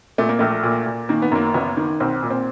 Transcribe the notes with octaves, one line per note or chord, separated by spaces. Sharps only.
A#2 A3
A#3
A#1 A3
A#2
A#2
D#3 A#3
B3
F#2 A#3
F#1 B3
D#3
B1 C4
A#2
C4